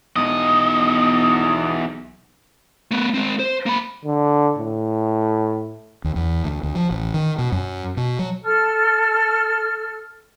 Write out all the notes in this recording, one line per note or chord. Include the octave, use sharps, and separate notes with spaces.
B1 E2 D#5
A3 B3
G#3 C4
C5
A#3 B5
D3
A2
D#2
E2
D2
D2
F3
A1
D#3
B2
F#2
B2
F#3
A4 F6